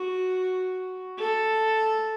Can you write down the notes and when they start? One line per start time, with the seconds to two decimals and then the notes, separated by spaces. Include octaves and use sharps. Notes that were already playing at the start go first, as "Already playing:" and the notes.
Already playing: F#4
1.19 A4